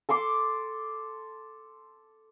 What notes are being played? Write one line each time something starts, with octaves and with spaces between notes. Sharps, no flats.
A4 A5 C6 D6